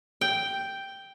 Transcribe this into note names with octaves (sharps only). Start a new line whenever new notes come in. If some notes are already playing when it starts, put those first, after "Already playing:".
G5